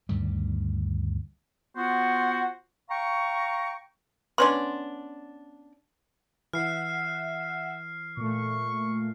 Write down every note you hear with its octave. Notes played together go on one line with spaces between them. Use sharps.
D2 G2 D#3 G3
B3 F4 F#4 C5 F#5
F5 G5 A#5 C#6
B3 C#4 D4 C6
E3 E5 F#5 F6 C7
A#2 A3 C#6